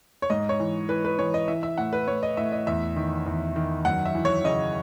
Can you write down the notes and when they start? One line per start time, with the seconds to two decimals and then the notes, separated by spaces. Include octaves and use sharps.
0.22 C#5
0.30 G#2 D#5
0.49 C#5
0.60 E3
0.89 E3 B4
1.05 B4
1.19 E3 C#5
1.34 D#5
1.48 E3 E5
1.63 E5
1.78 A2 F#5
1.93 B4
2.07 A2 C#5
2.23 D#5
2.37 A2 E5
2.52 D#5
2.67 E2 E5
2.96 D#3
3.26 E2
3.56 D#3
3.85 F#2 F#5
4.05 E5
4.15 E3
4.25 C#5
4.44 C#3 D#5